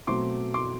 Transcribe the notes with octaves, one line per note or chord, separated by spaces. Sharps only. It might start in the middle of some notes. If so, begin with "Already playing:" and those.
B2 F#3 A3 C4 C6 D6
C6 D6